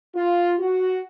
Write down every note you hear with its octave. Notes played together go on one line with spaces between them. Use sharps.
F4
F#4